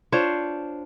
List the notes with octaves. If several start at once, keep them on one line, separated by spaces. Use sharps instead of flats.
D4 F4 C5 C#5